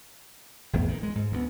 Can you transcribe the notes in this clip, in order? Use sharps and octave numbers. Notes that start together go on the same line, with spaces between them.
G#1 E2 A2 B3
D#3
G#3
G#2
D2 G3 B3